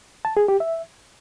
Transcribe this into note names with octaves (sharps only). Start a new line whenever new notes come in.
A5
G#4
G4
E5